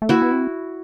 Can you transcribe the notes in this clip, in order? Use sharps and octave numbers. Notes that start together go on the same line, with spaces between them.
A3
A#3 E4 F#4
B3
C4